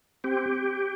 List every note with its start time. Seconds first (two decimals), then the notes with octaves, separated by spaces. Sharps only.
0.24 C4 G4